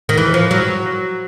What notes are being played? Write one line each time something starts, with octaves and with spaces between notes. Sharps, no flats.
D#3
E3
F3
F#3